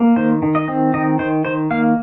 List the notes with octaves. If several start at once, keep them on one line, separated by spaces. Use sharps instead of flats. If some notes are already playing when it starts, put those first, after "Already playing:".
Already playing: A#3
D#3 C5
D#3
D#5
C4
D#3 D#5
D#3 C5
D#3 C5
A#3 F5